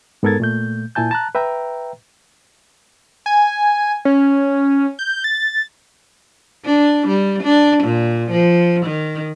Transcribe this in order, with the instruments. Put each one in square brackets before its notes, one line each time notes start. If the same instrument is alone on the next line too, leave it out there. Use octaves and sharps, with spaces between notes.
[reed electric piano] G#2 B3 A4 A#4 G#6 A6
A#2 A3 G6
A#2 E4 G#5 A5 G6
A5 A#5 F#6
B4 E5 G5 A#5
[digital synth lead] G#5
C#4
G6
A6
[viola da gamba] D4
G3
D4
A#2
F3
D#3